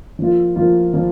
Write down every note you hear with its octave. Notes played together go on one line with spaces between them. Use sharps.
F3 A#3 F4
F3 A#3 F4
F3 A#3 F4